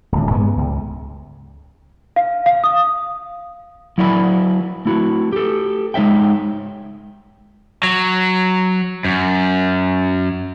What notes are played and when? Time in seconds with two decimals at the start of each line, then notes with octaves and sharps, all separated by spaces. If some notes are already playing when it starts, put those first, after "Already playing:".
0.12 D1 C#2
0.30 G2 G#3 B3
0.57 C#2
2.16 F5
2.46 F5
2.64 D#6
3.98 F#3 E4 D5 E5 A#5 B5
4.85 A3 E4 F#4
5.33 G4 A4
5.94 G#3 D#4 C#5 E5 G5
7.83 F#3
9.05 F#2